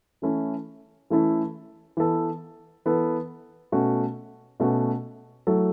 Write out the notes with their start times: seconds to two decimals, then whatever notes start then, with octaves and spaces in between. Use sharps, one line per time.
0.22 E3 A3 C#4 E4 A4
1.10 E3 A3 C#4 E4 A4
1.97 E3 B3 A4
2.86 E3 B3 A4
3.72 B2 A3 C#4 F#4
4.60 B2 A3 C#4 F#4
5.47 F#3 A3 E4 A4